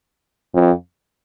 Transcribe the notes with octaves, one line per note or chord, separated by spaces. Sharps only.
F2